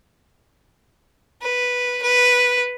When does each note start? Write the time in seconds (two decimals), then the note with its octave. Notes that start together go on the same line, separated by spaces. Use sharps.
1.42 B4
2.02 B4